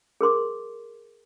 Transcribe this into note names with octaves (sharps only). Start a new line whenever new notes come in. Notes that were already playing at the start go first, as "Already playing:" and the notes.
G#4 A#4 C6 D6